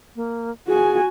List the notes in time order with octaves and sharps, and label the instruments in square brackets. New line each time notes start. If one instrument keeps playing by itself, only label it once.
[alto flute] A#3
[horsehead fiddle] F#4 G#5 [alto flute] G#4